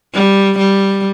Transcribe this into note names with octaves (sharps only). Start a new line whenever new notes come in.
G3
G3